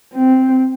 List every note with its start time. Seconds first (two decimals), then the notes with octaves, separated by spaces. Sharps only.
0.14 C4